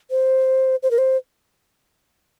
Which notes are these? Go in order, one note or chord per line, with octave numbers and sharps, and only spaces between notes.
C5
C5
A#4
C5